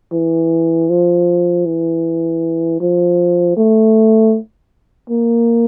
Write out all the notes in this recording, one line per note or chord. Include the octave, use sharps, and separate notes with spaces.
E3
F3
E3
F3
A3
A#3